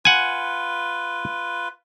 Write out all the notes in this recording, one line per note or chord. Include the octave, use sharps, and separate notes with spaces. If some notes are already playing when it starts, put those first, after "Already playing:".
F4 B4 F#5 G#5